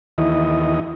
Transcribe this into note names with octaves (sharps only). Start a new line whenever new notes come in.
D#2 E3 E4 D#5